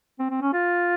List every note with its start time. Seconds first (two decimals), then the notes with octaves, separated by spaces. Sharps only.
0.19 C4
0.31 C4
0.42 C#4
0.54 F4